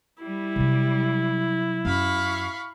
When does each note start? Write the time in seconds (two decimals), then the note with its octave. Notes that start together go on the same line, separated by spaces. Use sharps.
0.23 G3 E4
0.56 C3 F#3
1.85 F#2 F5 B5 C#6